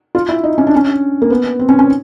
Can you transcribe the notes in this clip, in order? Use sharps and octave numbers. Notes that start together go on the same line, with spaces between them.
F4
E4
D#4
C#4
D4
C#4
A#3
B3
C4
C#4
C#4